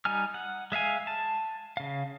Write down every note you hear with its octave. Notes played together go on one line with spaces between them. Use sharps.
G3 D#4 G#5 F6
F#5
G#3 E5 F5 G#5
A5
C#3 F5